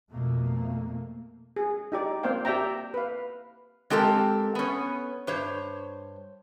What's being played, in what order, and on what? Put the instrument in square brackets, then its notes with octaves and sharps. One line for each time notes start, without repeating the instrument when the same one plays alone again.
[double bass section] F2 B2 A3 A#3
[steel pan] G#4
D#4 G4 D5
A#3 C4 C5 D5 F5 G5
G4 D5 E5 G5 A#5
B4 F5
[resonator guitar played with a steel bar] G#3 C4 G4 A4 A#4
B3 C#4
G2 C5 C#5